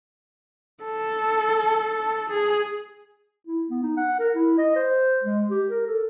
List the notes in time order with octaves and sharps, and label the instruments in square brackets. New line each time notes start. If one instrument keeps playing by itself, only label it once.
[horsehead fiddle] A4
G#4
[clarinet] E4
B3
D#4
F#5
A#4
E4
D#5
C5
G#3
G4
A#4
A4